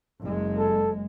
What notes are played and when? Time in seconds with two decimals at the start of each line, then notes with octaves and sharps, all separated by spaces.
0.21 F#1 G#3
0.58 A4